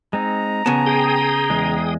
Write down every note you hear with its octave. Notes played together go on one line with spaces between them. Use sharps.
G#3 C4 D#4 A#5
C#3 B3 G#5 A5
G#4 G5 D#6
E2 G#3